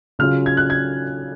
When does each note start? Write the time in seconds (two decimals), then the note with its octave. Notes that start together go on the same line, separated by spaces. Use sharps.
0.19 C#3 F#3 C#4 F4 F6
0.46 G#6
0.57 F#6
0.70 G#6